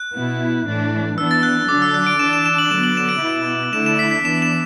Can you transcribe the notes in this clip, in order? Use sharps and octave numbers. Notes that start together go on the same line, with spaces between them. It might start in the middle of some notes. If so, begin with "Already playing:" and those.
Already playing: F#6
B2 B3 E4
A2 E3 D4
E3 B3 D4 E6
A6
F#6
D3 F#3 D4 D6
E6
F#6
D7
E3 D4 E7
E7
E7
F#7
D3 F#3 B3 E7
F#7
E7
D7
B2 B3 E4
D3 A3 E4 E7
E7
B6
B6
E3 B3 D4 E7
E7